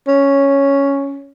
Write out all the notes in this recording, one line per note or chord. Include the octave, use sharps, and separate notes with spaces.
C#4